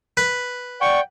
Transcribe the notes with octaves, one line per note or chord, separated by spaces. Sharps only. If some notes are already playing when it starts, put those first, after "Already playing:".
B4
D5 F#5 G5 C#6